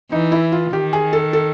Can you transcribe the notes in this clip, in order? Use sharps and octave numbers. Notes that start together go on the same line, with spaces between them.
E3 D#4
E4
F4
D#3 G4
G#4
A4
A4